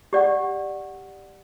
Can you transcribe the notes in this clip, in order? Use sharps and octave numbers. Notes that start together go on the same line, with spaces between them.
G4 D5 F#5